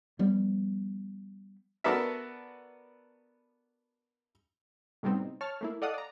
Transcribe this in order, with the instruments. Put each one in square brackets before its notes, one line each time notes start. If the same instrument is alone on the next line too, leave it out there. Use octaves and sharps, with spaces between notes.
[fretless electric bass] F3 G3 B3
[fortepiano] B3 D4 F#4 A4 A#4 E5
[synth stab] A2 C3 G3 B3 C4 D#4
C#5 A5 F6
A3 A#3 E4
A4 D5 D#5 F5 F#5 D#6
D5 A#5